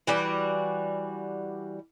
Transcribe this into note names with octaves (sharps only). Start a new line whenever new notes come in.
E3 G3 F#4 D5